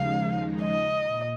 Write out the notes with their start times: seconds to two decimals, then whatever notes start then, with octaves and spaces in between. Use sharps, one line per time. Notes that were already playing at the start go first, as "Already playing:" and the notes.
Already playing: D#2 C#3 F3 G#3 D#4 F5
0.63 D#5
1.06 A#2